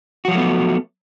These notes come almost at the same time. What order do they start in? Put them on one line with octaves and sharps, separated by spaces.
F#4 F3 F#3 A3 B3